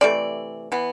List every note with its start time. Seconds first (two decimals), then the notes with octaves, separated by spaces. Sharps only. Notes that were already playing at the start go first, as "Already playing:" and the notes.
0.01 C3 E3 A3 D5
0.72 E3 B3